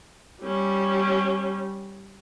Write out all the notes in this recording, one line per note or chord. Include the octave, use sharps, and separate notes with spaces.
G3 C#4